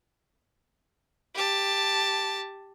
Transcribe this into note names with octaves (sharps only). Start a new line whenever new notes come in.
G4 A5